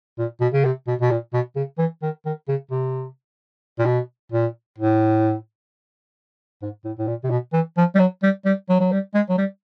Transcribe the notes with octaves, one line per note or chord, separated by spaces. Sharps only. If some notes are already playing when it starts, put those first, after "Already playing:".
A#2
B2
C#3
C3
B2
B2
A#2
B2
C#3
E3
D#3
D#3
C#3
C3
A#2
B2
A#2
A2
G#2
A2
A2
A#2
C3
B2
E3
F3
G3
F#3
G3
G3
F#3
F#3
G3
G#3
F#3
G3